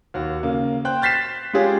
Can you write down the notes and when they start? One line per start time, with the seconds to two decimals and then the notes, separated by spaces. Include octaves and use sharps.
0.14 D#2 F#4
0.43 C#3 A#3
0.85 C5 G5 F#6
1.02 F6 G6 A6 B6 C7 E7
1.53 G#3 C#4 F4 G4 G#4 C#5